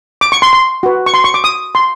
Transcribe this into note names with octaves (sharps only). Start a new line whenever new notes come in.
D6
C#6
C6
C6
F#4 B4
C#6
C6
C#6
D6
D#6
C6